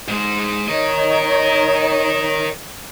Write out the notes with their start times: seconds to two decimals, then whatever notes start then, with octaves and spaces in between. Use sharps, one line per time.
0.08 G#2 G#3
0.68 D#4 A#4 C#5 D#5